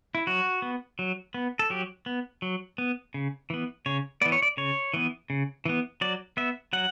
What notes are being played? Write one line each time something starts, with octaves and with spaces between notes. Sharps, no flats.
E4
F#3 F#4
B3
F#3
B3
A4
F#3 G4
B3
F#3
B3
C#3
E3 B3
C#3 C#5
E3 B3 D5
C#5
D5
C#3 C#5
E3 B3
C#3
E3 B3
F#3 D5
B3 E5
F#3 F#5